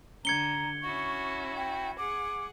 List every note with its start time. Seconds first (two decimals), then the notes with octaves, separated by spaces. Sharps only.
0.25 D3 A#5 G#6 C#7 G7
0.82 C#4 E4 F#4 C#6
1.57 G5
1.98 G#4 F#5 D6